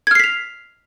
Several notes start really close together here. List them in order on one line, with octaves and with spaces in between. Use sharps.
G#6 F6 C7 B6 F7